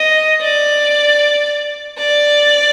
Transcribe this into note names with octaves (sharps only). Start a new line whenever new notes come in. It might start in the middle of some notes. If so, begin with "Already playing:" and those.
Already playing: D#5
D5
D5